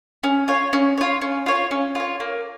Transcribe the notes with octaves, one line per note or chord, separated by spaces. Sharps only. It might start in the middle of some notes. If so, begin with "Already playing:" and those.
C#4
F4 C#5
C#4
F4 C#5
C#4
F4 C#5
C#4
F4 C#5
A#3